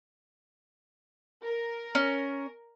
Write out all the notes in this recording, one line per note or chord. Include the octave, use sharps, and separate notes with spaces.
A#4
C#4